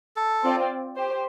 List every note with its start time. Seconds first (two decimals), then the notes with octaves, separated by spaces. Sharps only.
0.16 A4
0.43 C4 F4 D5
0.96 G4 C5